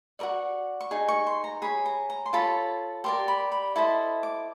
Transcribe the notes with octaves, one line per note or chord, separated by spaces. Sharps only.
F#4 A#4 D5 C#6
C#6
D#4 G#4
C#6
C6
A#5
G#4 C#5 B5
A#5
A#5
C6
F4 A4 C#5 B5
G4 A#4 D5 C6
B5
B5
E4 A4 C5 D#5 B5
D6